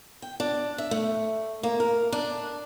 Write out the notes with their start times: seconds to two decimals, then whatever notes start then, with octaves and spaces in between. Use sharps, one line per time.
0.22 G5
0.40 D4
0.78 E5
0.91 A3
1.63 A#3
1.80 A#4
2.12 D4